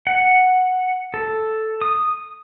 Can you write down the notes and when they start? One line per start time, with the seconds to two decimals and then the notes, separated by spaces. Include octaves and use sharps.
0.07 F#5
1.14 A4
1.81 D#6